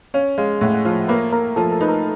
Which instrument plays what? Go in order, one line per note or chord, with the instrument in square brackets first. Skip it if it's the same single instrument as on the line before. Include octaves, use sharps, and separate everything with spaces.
[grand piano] C#4 [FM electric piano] F5
[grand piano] G#3 [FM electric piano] F5
[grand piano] A2 [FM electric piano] F#5
[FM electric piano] F#5
[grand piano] F3 [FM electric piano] F5
[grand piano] A#3 [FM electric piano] B4
[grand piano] A#3 [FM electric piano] A#4
[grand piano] F3 [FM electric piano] A4
[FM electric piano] A4
[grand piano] D#4 [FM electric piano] B4
[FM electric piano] A#4